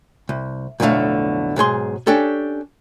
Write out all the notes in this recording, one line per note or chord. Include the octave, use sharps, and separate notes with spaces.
C2
B1 F2 A2 D3 A3 F5
B1 G#2 G#4 C6
C#4 D4 G4 A4